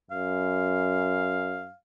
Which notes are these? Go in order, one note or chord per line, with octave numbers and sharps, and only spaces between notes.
F#2 F5